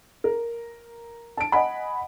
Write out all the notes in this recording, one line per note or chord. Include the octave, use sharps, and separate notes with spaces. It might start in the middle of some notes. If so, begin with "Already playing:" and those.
A#4
A5 D7
D#5 F#5 G#5 B5